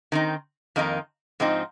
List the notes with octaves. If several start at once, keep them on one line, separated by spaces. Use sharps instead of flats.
D#3 C4 D#4
F2 D#3 A#3 D#4
G#2 F3 C4 D#4